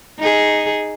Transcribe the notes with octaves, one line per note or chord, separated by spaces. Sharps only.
D#4 G#4